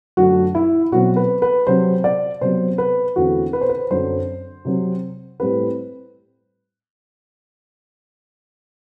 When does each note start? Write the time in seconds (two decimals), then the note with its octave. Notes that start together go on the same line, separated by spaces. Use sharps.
0.17 F#2 D3 A3 F#4
0.55 E4
0.92 B2 F#3 C4 F#4
1.16 B4
1.42 B4
1.67 C3 F#3 C4 C5
2.04 D5
2.41 C3 F#3 B3 C5
2.78 B4
3.16 E2 D3 A3 C4 F#4
3.53 B4
3.61 C5
3.69 B4
3.91 F#2 D3 F#3 C4 C5
4.65 C3 F#3 C4
5.40 A2 G3 C4 B4